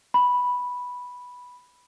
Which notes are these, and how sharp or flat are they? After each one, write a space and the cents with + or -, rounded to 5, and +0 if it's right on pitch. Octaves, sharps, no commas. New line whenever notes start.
B5 -5